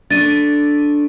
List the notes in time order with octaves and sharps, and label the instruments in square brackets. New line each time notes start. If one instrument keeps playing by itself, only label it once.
[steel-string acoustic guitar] A3 D4 [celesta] A6 D#7